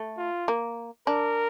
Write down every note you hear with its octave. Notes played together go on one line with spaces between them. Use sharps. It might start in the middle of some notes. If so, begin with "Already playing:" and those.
Already playing: A3
F4
A#3
D4 A#4